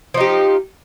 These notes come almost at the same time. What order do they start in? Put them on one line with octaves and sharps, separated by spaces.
F3 D#4 G4